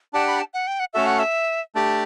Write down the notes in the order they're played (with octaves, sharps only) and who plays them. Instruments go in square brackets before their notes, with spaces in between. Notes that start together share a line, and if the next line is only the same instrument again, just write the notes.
[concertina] D4 G4 D5 F#5 [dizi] A5
[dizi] B5
A5
F#5
G5
F#5
[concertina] A3 C#4 F#4 A4 [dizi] E5
[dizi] F#5
E5
[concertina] A3 D4 G4 D5